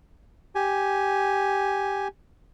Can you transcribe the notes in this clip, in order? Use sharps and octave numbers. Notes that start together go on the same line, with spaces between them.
G4 G#5